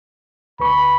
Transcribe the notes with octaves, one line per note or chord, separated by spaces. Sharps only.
D2 B4 B5 C#6